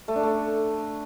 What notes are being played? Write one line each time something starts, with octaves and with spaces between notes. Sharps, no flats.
A3
D4
A3